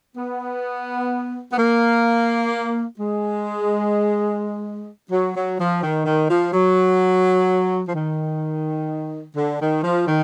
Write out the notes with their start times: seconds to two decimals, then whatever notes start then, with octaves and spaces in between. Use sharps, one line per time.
0.16 B3
1.52 B3
1.58 A#3
2.99 G#3
5.12 F#3
5.35 F#3
5.59 F3
5.83 D#3
6.06 D#3
6.29 F3
6.53 F#3
7.88 F3
7.95 D#3
9.36 D3
9.61 D#3
9.83 F3
10.08 D#3